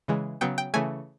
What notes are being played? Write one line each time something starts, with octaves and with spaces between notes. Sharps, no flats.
C#3 E3 G#3
C#3 F#3 B3 G5
G5
C#3 E3 A3 G#5